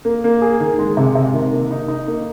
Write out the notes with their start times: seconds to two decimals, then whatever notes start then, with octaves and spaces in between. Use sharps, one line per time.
0.05 A#3
0.24 A#3
0.42 G#4
0.60 D#3
0.79 G#3
0.97 C3
1.15 C3
1.33 D#3
1.52 A#3
1.71 D#4
1.88 D#4
2.08 A#3